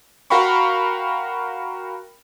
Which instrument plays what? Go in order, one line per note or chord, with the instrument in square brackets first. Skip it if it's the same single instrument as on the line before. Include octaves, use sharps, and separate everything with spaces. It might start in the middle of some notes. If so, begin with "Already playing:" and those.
[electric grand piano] F#4 A#4 F5 G5 B5 C#6